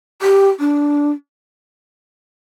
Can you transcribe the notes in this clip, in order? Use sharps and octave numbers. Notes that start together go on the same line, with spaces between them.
G4
D4